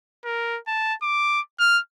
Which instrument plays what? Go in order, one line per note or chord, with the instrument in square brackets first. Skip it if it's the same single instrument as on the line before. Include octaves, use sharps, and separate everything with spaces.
[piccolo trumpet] A#4
A5
D6
F6